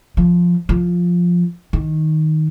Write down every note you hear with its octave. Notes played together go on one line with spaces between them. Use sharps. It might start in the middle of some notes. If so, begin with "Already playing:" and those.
F3
F3
D#3